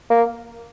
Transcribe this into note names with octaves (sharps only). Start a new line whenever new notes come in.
A#3